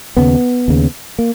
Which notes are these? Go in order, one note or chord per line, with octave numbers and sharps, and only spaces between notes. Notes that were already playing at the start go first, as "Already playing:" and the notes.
D#2 C#3 B3
D#2 C#3
A#3